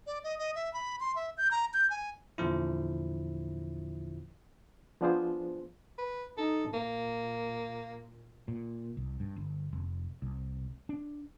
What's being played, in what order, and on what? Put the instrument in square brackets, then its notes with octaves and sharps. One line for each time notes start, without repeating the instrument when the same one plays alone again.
[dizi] D5
D#5
D#5
E5
B5
C6
E5
G6
A#5
G6
G#5
[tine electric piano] E2 A#2 D3 F3 E4
[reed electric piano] F3 B3 D4 F4 G#4 C5
[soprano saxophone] B4
[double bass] D#4 [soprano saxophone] A4
[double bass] A#2 [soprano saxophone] A#3
[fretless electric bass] A#2
C2
G2
G1
F1
C2
D4